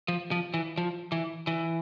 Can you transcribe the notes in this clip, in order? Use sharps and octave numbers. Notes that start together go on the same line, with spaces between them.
F3
F3
E3
F3
E3
E3